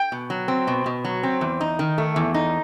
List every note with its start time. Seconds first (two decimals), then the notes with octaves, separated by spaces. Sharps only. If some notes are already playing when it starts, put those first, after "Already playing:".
Already playing: G5
0.12 B2
0.30 F#3
0.48 C4
0.67 B2
0.86 B2
1.05 F#3
1.23 C4
1.41 E2
1.61 D#4
1.79 D#3
1.98 A3
2.16 E2
2.34 D#4